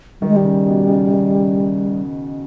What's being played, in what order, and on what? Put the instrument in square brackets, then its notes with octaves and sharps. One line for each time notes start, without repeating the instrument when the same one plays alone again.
[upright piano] D#3 [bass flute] G3
[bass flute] G#3
G3
[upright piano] C#3
B2
C#3
D#3